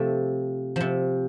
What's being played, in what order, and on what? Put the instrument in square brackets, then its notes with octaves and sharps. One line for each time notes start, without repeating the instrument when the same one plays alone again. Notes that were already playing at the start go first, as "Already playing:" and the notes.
Already playing: [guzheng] C3 F3 A3
C3 F3